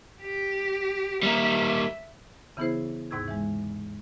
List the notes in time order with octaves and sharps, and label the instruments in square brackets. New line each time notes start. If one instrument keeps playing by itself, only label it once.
[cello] G4
[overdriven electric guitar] G3 A#3 [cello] E5
[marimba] C#3 E3 B3 E4 G#4 C5
D#2 G#2 C3 C#6 E6 G#6
E3 G#3